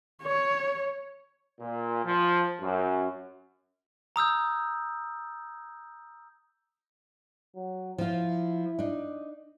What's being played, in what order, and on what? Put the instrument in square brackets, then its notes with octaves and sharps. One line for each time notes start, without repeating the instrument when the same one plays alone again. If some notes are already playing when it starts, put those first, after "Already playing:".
[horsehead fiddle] C#5
[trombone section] A#2
F3
F#2
[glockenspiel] A#5 D#6 E6 G6
[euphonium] F#3
[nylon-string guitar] F3 F4 [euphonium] E4
[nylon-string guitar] D4 D#4